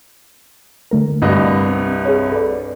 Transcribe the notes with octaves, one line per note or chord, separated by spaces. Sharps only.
D3 A3 A#4
C2 G2 D#5
C4
G#4 C#5
A4 B4 D5